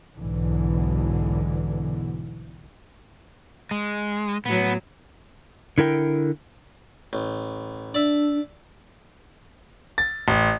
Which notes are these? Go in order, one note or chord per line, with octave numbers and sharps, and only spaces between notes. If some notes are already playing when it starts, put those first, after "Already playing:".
B1 E2 G#2 B2 D3 E3
G#3
A2 F#3 B3
D3 E4 A#4 G5
A1
D4 D5 E5
A6
A1